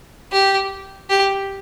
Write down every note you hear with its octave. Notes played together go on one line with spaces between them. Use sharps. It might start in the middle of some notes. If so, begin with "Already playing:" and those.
G4
G4